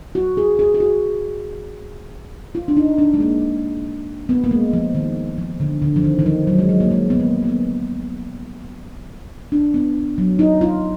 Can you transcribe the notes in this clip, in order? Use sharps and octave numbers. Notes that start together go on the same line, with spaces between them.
F#4
G#4
G#4
G#4
F#4
F4
D4
D#4
D4
G#3
A#3
B3
A#3
G#3
F3
D#3
F3
D3
D3
F3
D#3
D#3
F3
F#3
G#3
F#3
A#3
G#3
B3
A#3
A#3
B3
D4
B3
F#3
D#4
F4